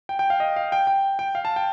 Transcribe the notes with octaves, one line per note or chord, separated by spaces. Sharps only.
G5
G5
F5
D#5
F5
G5
G5
G5
F5
A5
G5